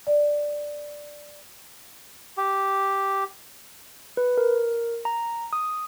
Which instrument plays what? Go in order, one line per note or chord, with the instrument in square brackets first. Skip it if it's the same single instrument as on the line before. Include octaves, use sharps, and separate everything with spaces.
[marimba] D5
[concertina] G4
[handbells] B4
A#4
A#5
D#6